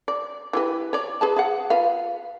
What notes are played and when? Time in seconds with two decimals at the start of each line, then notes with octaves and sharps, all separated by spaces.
0.08 D5
0.53 E3 G4 B4
0.93 C#5 D5
1.21 G#4 B4 A5
1.36 G#4 F5 F#5
1.70 F4 B4 F5